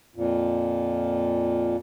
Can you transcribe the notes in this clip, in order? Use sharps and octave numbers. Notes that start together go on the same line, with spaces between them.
F2 A#2